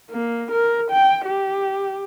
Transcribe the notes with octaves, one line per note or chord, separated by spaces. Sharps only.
A#3
A#4
G5
G4